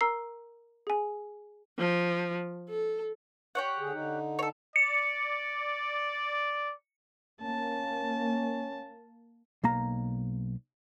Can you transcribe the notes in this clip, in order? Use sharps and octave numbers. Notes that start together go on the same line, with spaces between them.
A#4 A#5 E6 C7
G#4 G#5
F3
A4
G4 C#5 F#5
D3 G#4
D3 D#4
A4 C#5
D5 C#7
A#3 C#4 A5
B1 A#3 A#5